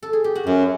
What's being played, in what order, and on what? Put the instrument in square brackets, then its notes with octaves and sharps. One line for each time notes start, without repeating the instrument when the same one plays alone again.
[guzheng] A4
G#4
G4
F#4
[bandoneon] F#2 [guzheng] F4